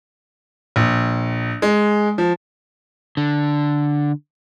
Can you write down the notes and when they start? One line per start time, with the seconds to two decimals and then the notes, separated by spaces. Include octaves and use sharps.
0.76 A#1
1.62 G#3
2.18 F3
3.17 D3